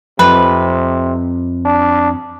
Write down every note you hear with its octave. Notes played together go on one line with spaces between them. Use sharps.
F2 C3 B4
D4